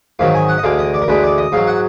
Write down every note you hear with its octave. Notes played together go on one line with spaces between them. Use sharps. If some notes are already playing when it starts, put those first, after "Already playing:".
G#2 D#3 F#3 F5
G#5
F#5
D#5
D2 D3 G#3 F5
D#5
D5
A#4
D2 D3 G#3 B4
D5
D#5
G#2 F#3 F5
F#5